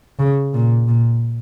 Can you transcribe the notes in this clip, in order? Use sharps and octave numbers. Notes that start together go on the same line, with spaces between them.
C#3
A#2
A#2